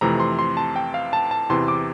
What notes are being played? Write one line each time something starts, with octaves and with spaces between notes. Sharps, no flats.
F2 C3 E3 A3 A#5
C6
C6
A5
G5
F5
A5
A5
E2 C3 E3 C6
D6